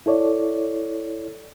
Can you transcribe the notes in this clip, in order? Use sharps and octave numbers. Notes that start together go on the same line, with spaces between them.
E4 A4 C#5 D5